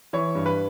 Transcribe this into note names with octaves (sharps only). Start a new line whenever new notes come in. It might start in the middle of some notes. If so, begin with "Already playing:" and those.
E3 C#5
G2
B4